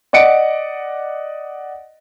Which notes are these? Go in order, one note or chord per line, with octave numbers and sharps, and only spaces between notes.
D5 D#5 F#5 C#7 D7